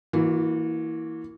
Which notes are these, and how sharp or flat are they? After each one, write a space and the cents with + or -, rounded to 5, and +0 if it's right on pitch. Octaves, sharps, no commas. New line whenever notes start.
E3 -15 A#3 +0 F#4 -45